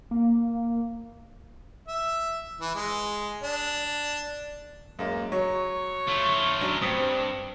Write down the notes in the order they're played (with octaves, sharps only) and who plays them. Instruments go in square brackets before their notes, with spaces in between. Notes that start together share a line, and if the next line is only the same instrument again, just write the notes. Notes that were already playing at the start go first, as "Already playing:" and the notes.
[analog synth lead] A#3
[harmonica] E5
E3
G#3
D4
[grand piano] F#2 A#3 [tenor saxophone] G#3
[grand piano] F#3 [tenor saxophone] C#5
[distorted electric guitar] A3 F4
[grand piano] F#3 C#4 D4
[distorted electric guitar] G2 [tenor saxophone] C4 [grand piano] D#6 B6 C#7